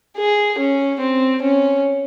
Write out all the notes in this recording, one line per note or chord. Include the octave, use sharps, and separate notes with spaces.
G#4
C#4
C4
C#4